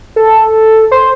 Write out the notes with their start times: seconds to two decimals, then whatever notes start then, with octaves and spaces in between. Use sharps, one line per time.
0.16 A4
0.91 C5